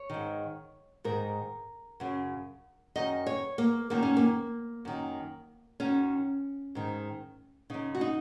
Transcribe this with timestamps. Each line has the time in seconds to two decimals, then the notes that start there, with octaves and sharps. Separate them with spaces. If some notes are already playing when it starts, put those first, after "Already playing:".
Already playing: C#5
0.10 G#2 D#3
1.04 G#2 D#3 A#4
2.00 F#2 C#3
2.96 F#2 D#3 D#5
3.27 C#5
3.58 A#3
3.90 F#2 D#3 A#3
4.03 C#4
4.17 A#3
4.85 F#2 D#3
5.80 F#2 D#3 C#4
6.75 G#2 D#3
7.70 F#2 C#3 D#4
7.95 F#4
8.01 D#4